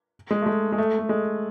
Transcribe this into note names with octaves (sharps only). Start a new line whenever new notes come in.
G#3
A3
G#3
G#3
A3
A3
G#3